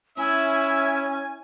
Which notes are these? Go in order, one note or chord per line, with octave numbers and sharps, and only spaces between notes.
C#4 E4 E5 G#5